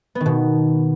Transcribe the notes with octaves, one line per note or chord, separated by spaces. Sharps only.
B3
D#3
B2